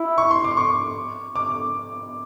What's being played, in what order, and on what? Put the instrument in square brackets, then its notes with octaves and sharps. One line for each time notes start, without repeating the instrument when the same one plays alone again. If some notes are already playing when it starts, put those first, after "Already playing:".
Already playing: [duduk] E4
[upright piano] C#6
C6
D6
C#6
D6